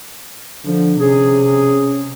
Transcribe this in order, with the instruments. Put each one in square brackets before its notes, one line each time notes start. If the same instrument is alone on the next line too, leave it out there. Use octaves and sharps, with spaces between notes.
[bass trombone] D3 [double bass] F3
[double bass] C3 [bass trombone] C#4 [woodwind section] G#4